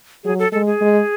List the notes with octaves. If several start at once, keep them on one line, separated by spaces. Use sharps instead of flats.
F#3 G#4
A4
G#3 A4
G#4
G#3